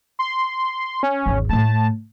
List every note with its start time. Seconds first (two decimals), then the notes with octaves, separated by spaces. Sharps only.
0.19 C6
1.03 C#4
1.26 G#1 E2
1.49 A2 A3 A5